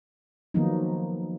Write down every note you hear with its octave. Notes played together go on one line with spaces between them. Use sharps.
D#3 F3 F#3 A#3 B3 D#4